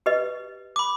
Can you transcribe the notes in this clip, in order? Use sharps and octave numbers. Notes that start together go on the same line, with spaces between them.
G4 B4 D#5
B5 D6